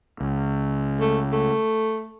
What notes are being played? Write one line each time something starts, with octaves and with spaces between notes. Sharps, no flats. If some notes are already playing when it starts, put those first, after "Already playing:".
C#2
A3
A3